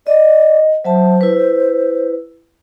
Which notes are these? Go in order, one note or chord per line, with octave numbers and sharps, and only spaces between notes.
D5 D#5
F#3 C5 E5 A5
E4 B4